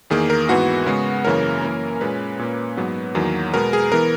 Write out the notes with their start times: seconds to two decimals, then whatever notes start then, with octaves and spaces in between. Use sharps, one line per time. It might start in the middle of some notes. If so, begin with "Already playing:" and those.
0.10 E2 D#3 A#3 G#4
0.30 A#4
0.49 G#2 E3 B3 F#4
0.86 C#3 G#3 B3
1.24 F#2 C#3 E3 A#3 C#4 A#4
1.62 F#2 E3 A#3 C#4
2.01 A#2 G#3 C#4 B4
2.39 A#2 A#3 C#4
2.77 G#2 F#3 B3
3.15 E2 D#3 F#3 A#3
3.54 B2 G#3 B3 A#4
3.73 G#4
3.92 E3 B3 A#4